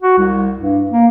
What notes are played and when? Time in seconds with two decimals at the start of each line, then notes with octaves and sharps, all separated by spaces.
0.02 F#4
0.17 C2
0.59 G2
0.91 A#3